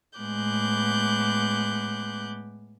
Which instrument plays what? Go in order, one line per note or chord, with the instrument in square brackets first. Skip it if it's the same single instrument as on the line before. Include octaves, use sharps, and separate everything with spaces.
[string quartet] A2 G#3 B3 D6 F#6 G6